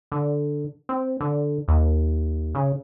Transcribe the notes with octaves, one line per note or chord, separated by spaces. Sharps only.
D3
C4
D3
D#2
C#3